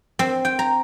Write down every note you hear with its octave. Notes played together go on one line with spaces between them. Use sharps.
C4
G5
A#5